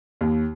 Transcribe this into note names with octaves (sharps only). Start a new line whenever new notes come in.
D#2